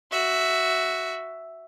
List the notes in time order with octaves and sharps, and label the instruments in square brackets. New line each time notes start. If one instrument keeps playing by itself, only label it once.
[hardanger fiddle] F#4 E5